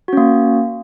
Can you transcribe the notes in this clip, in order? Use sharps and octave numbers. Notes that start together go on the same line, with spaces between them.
A#3 C#4 F#4